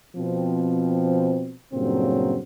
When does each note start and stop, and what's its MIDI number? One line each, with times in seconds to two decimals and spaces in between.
0.16 1.55 47
0.16 1.55 53
0.16 1.55 60
1.73 2.38 43
1.73 2.38 46
1.73 2.38 49
1.73 2.38 54
1.73 2.38 60